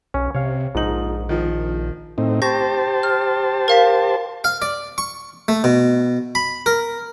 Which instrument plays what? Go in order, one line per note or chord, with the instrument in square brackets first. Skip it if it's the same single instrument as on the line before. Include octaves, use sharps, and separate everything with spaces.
[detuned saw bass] B1 [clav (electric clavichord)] C#4
[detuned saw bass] C3 [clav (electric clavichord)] C#5 F5
[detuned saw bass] A#1 [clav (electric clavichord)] G#2 D#4 [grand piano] F3 F#7
[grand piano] D#3 F3
[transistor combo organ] A2 C4 D#4
[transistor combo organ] G4 C5 A5 [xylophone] C#6 G6 A#6
[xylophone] F6
A#4 F5 B6
[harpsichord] F5
D5
C#6
A3
B2
B5
A#4